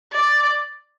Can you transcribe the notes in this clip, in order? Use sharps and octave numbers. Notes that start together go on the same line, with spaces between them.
D5